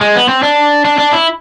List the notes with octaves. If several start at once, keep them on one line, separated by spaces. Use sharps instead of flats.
G#3
B3
C4
D4
D4
D4
E4